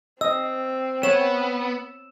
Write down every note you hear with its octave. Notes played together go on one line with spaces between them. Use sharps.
C4 D#5 E6
B3 C#5 E7